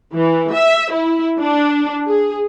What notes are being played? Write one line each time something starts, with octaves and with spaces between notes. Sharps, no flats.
E3
E5
E4
D4
G#4